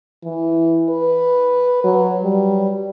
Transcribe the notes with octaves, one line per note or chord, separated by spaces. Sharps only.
E3
B4
F#3
G3